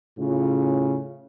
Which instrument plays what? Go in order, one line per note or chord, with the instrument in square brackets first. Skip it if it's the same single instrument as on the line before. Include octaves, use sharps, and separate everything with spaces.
[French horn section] A2 C#3 C#4 F4